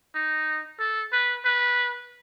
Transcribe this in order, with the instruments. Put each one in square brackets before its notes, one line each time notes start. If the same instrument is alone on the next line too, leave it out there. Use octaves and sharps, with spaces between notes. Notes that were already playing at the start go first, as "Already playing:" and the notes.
[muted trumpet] D#4
A4
B4
B4